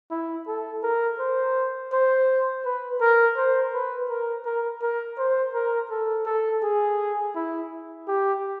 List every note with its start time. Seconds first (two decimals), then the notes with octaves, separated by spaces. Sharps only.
0.11 E4
0.47 A4
0.83 A#4
1.19 C5
1.93 C5
2.65 B4
3.00 A#4
3.36 C5
3.73 B4
4.09 A#4
4.46 A#4
4.82 A#4
5.18 C5
5.54 A#4
5.90 A4
6.26 A4
6.63 G#4
7.35 E4
8.07 G4